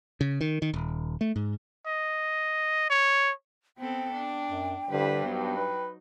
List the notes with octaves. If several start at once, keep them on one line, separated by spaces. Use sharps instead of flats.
C#3
D#3
D#3
D#1
A3
G#2
D#5
C#5
B3 C4 A4 G5
D4
F#2
G2 D3 E4 B4 C5
F#3 B3 D#4
B4